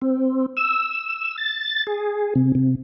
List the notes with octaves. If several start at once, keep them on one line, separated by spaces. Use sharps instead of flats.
C4
E6
A6
G#4
C3
C3